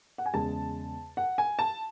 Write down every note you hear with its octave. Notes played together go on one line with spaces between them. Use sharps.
F#5
G#5
E2 C#3 G#3 A5
F#5
G#5
A5